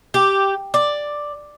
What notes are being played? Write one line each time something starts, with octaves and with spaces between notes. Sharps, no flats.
G4
D5